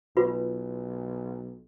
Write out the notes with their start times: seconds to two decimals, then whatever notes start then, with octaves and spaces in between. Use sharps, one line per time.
0.17 B1 F4 B4